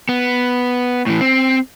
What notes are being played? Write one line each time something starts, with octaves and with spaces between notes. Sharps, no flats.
B3
A2 E3
C4